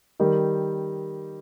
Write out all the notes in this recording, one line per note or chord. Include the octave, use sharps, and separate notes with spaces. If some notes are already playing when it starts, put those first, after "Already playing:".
D#3 G3